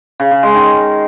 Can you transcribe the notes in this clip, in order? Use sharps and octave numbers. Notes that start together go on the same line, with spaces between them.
C#3
C#3
G#3
D#3